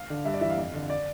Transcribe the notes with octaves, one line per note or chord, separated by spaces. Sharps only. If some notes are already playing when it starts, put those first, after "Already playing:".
Already playing: F5
D3
G2 E5
D5
E3 E5
F5
F2
D3
D5